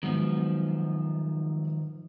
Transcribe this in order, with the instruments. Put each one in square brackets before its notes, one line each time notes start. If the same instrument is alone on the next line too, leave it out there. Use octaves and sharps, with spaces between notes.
[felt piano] G#2 F#3 B3 [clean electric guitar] D#3 F3